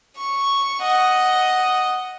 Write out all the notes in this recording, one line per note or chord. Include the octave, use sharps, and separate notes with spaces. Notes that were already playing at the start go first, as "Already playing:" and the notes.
C#6
D#5 F#5